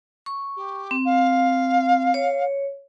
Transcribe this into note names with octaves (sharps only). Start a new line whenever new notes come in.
C#6
G4
C4
F5
C#5